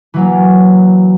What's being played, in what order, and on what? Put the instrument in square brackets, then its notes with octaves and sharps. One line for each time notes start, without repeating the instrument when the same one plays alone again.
[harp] E3 F#3 A#3